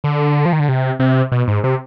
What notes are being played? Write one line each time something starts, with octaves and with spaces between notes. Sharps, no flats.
D3
F3
D#3
D3
C3
C3
B2
G#2
C3